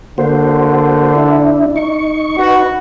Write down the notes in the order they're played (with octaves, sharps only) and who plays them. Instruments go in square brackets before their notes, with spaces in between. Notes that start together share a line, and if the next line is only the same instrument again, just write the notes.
[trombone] D3 [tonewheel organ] A#3 F#4 C5
[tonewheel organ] D4 E4
D#4 C#6
[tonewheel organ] D#4 B4 [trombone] F#4